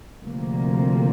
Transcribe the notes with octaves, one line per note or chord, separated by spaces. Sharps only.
D2 C3 F3 A#3